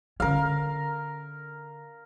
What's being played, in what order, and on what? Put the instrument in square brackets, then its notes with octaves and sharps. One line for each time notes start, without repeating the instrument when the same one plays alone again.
[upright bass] D3 C#4 [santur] A#4 F5